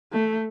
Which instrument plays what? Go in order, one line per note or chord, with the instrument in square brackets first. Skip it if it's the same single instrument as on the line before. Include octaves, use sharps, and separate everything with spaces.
[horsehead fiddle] A3